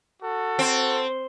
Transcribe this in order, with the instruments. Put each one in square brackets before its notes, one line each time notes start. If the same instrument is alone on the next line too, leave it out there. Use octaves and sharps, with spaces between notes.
[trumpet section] F#4 A4
[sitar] C4